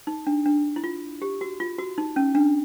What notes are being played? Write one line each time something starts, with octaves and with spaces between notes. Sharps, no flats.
D#4
D4
D4
E4
F4
G4
F#4
F4
F#4
D#4
C#4
D4